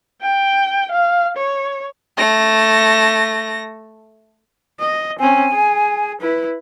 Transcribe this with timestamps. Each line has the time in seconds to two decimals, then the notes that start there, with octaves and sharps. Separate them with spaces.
0.22 G5
0.92 F5
1.37 C#5
2.18 A3 A#6
4.80 D#5
5.19 C4 C#4 G#5
5.53 G#4
6.21 E4 B4